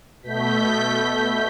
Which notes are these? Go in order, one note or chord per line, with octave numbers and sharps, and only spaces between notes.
B2 A3 G6 B6